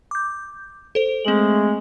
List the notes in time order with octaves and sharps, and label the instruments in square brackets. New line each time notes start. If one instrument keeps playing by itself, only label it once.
[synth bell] D6 G6
A4 C5
[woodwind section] G#3 A3 [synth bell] C4 F#7